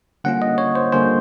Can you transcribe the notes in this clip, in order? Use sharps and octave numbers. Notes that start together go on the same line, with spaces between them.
D3 G3 A#3 C#4 F4 F#5
D#5
C#5
C5
D3 G3 A#3 C#4 F4 C5